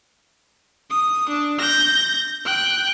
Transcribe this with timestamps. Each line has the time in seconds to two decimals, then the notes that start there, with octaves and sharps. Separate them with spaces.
0.91 D#6
1.29 D4
1.59 G6 A#6
2.45 G5 F#6